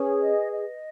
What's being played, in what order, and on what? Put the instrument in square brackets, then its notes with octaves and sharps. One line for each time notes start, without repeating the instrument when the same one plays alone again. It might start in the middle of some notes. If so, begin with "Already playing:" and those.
Already playing: [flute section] C#4 G#4 [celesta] B4
[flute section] D#5
D#5